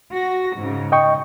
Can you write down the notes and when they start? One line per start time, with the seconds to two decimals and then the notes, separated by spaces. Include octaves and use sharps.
0.12 F#4 A#6
0.56 G#2 C#3
0.92 D#5 G5 C#6